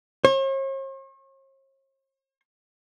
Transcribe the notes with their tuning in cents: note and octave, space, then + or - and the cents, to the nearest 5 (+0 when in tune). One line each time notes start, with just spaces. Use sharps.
C#5 -45